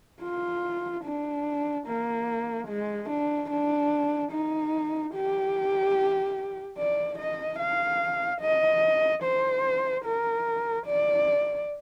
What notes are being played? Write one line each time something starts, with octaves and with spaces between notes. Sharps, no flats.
F4
D4
A#3
G#3
D4
D4
D#4
G4
D5
D#5
F5
D#5
C5
A#4
D5